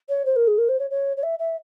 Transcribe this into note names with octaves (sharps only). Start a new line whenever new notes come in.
C#5
C5
A#4
G#4
A#4
C5
C#5
C#5
C#5
E5
E5